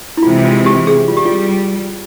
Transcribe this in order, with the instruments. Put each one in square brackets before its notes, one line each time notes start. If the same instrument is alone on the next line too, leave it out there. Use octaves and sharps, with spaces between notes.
[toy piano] E4
[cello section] C3 E3 G#3 [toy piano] F4
[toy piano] F4
G4
G#4
[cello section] G3 [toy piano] F4
[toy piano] G4
F4